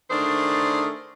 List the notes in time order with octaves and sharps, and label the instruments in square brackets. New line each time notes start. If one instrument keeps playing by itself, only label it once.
[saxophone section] D#3 A3 D4 G#4 A#4 C5